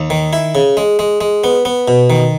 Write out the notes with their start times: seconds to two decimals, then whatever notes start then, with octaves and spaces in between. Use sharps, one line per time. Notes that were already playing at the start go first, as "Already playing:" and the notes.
Already playing: D#2
0.10 D#3
0.33 E4
0.55 C#3
0.77 G#3
0.99 G#3
1.21 G#3
1.44 B3
1.65 B3
1.88 B2
2.10 D#3